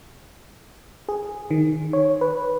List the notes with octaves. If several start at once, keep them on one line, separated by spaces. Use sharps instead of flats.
G#4
D#3
C#5
B4